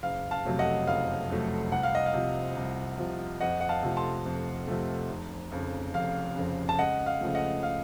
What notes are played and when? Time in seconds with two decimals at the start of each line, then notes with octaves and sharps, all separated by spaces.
0.03 F#1 F5
0.31 F5 A5
0.45 F2 C3 F#3 A3
0.59 D#5 F#5
0.87 F#1 F5
1.30 F2 C3 F#3 A3
1.72 C2 F#5
1.83 F5
1.95 D#5
2.06 F5
2.14 C3 F3
2.56 C2
2.99 C3 F3
3.40 F2 D#5 F#5
3.61 F#5
3.69 F5 A5
3.83 C3 F3 A3
3.97 A5 C6
4.26 F2
4.68 C3 F3 A3
5.10 F1
5.52 F2 C#3
5.94 F1 F5
6.36 F2 C#3
6.69 A5
6.79 C#2 D#5 F#5
7.06 F5
7.21 C#3 F3 A3
7.35 D#5 F#5
7.63 F5